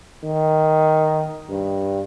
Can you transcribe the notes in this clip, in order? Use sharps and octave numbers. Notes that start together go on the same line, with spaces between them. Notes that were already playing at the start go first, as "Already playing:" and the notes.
D#3
G2